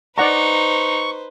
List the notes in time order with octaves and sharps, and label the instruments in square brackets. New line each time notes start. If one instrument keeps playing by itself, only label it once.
[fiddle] D#4 [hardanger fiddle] B4 C5 [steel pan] D5 F#5 A#5 [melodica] C#6